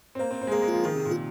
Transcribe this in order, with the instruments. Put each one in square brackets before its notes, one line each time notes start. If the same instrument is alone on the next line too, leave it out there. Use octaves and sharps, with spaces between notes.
[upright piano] C4
[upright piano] A#3 [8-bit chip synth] C5
[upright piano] C4
C4
G#3
[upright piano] A#3 [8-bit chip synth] G#4
[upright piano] G#3
[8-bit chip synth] F4
[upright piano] F3
[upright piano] D#3 [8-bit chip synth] G#4
[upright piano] C3
A#2
[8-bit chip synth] F4